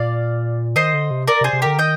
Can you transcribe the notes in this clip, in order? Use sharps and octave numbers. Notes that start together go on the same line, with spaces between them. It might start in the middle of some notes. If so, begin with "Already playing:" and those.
Already playing: A#2 D5 F5
D#3 C5 D#5
D3
C3
A#4 D5
C3
G#4 C5
C3
D3 G4 A#4
D#3 D#5 G5